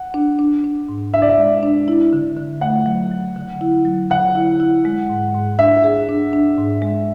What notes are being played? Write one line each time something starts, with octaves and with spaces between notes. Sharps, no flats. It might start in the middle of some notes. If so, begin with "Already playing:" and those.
Already playing: F#5
D4
D4
D4
G#2
D4 E5
D5
E5
G#3
D4
E4
D3
D3
A3 F#5
F#3
F#3
D3
E4
F#3
D3 F#5
E4
E4
G#3
G#2
G#2
D4 E5
G#4
D4
D4
G#2
G#3